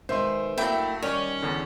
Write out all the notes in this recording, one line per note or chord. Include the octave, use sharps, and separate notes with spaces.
B2 D#3 G#3 C5 E5 C6
F#3 A3 A#3 D4 E4 E5 G5 B5
D#3 G3 C#4 C#5 D5
E2 D3